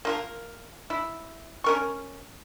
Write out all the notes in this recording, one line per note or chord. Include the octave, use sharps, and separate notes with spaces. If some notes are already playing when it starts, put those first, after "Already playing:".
A#3 F4 A#4
E4
C#4 A#4 C#6